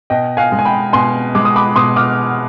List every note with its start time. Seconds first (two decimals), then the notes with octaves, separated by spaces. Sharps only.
0.10 B2 D#5 G5
0.37 F5 G#5
0.52 G#3
0.59 G#5
0.65 G5 B5
0.93 B2 G#5 C6
1.35 G#3 D6
1.45 D#6
1.56 B5 D6
1.76 B2 C6 D#6
1.96 D6 F6